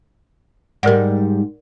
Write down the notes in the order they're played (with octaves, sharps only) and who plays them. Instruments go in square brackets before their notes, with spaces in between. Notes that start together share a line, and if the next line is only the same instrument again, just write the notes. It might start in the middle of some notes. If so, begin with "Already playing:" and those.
[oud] G#2 G3 [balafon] A#4 D5 F#5